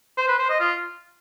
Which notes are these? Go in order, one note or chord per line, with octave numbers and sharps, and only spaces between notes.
C5
B4
C5
D#5
F4